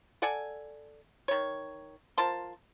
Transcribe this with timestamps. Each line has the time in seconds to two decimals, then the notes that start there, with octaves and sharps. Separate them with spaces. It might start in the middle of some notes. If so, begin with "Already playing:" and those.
0.22 A4 D5 F#5 G#5
1.28 D#3 C#5
2.18 F3 A#4 A5 C6